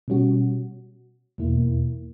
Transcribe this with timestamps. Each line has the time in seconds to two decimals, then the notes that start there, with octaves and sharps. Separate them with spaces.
0.08 B2 G3 C#4 F#4
1.38 E2 B2 A#3 E4